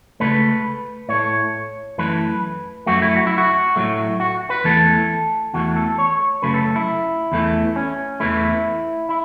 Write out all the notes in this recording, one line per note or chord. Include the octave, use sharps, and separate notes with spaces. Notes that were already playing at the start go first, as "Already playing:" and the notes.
C#2 B2 A3 B4
A2 A3 C#5
F#2 E3 A3 B4
F#2 F#3 A3 F#4
E4
F#4
E4
F#4
A2 F#3 A3
F#4
B4
E2 E3 A3 A4
E2 E3 A3 F#4
A4
C#5
F#2 C#3 F#3 A3 B4
A4
E4
E2 E3 A3
C#4
E2 E3 A3 E4
E4